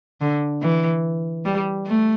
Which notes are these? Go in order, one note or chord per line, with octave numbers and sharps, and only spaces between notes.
D3
E3
G3
A3